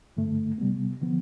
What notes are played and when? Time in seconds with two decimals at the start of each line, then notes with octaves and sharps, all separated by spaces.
0.17 G2 D3 A3
0.58 C3 G3 B3
1.02 D3 F3 B3